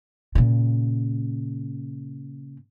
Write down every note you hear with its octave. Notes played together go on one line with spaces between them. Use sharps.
A#2 C#3